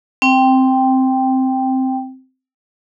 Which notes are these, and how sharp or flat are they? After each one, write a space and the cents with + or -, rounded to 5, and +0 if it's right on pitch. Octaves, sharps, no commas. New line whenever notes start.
C4 +0 G5 +0